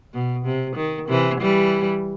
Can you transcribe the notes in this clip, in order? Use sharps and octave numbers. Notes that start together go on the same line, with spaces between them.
B2
C3
D#3
C3 E3
E3 G3